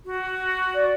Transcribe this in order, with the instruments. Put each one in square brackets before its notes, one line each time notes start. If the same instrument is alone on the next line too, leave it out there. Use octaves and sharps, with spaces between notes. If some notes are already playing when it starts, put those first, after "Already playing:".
[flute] F#4
[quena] D5